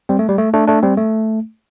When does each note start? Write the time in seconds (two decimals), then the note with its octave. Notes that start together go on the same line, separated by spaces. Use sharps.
0.09 G3 C4
0.19 A3
0.29 G3
0.38 A3
0.54 A3 D4
0.67 A3 D4
0.83 G3 C4
0.97 A3